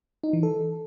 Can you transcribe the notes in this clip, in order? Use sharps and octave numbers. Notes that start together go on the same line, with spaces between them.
D#4
E3
A4